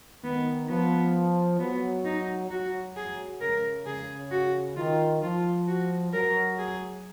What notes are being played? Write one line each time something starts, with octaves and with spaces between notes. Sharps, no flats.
D#3 B3
F3 B3
F#3 B3
D#4
F#3 F#4
G#4
C#3 A#4
C#3 G#4
F#4
D#3 F4
F3 F4
F#4
F#3 A#4
G#4